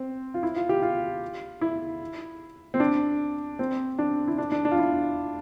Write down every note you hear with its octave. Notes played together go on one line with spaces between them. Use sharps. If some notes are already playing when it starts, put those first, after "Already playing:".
Already playing: C4
F4
E4
F4
G4
F4
E4
C4
D4
C4
D4
E4
D4
D4
D4
F4
E4